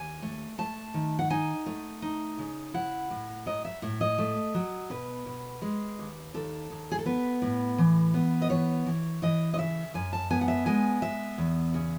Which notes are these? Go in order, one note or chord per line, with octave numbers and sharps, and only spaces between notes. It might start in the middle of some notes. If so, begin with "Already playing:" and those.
Already playing: D#2 G#5
A3
A3 A5
D#3
F#5
D#4 G#5
A3
D#4
C#3
E4 F#5
A2
F#3 D#5
E5
A2 E5
D#5
A3
F#3
B2 B4
B2
G#3
D#2
D#2 A4
D#2
G#4
A4
B3 B4
A2
E3
B3
D#5
E3 C#5
E3
E3 D#5
D#5
C#3 E5
F#2 G#5
A5
B3 G#5
F#5
E5
G#3 G#5
B3 E5
E2
C#3